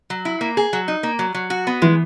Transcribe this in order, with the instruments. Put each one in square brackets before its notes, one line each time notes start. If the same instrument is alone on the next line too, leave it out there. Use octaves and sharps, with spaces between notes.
[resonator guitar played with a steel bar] F#3
E4
A#3
G#4
F#3
D#4
A#3
F#3
F#3
F#4
B3
[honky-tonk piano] E3 [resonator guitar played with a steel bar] G#3